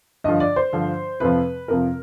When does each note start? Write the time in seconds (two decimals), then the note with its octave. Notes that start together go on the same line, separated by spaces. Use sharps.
0.24 G2 D3 F3 D#5
0.40 D5
0.56 C5
0.73 G2 D3 F3
1.20 F2 C3 F3 B4
1.68 F2 C3 F3 A#4